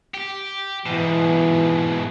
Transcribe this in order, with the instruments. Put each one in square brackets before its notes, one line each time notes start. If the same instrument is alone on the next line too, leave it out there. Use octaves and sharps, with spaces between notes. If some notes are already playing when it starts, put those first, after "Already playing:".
[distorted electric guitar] G4
[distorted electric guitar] G#2 B2 [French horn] E3